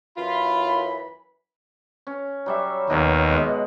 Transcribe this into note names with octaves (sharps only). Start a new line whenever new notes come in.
F#2 E3 F4 B5
C#4
F#3 G3 E5
D#2 B2 F#3 A#4
B2 G#3 F#5